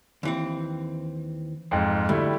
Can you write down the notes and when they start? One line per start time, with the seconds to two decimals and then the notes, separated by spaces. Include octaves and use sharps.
0.23 D#2 E3 C4
1.71 F2 G#2
2.09 D2 G3 A3 E4